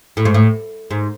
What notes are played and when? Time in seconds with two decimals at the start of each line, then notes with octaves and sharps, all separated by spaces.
0.17 A2
0.25 G#2
0.34 A2
0.91 G#2